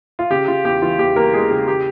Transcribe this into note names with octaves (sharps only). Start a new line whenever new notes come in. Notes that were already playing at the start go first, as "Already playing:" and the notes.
F4
C#3 G4
C#3 F4
E2 G4
E3 F4
E2 G4
E3 A#3 A#4
E2 G#3 G#4
C#3 G4
G4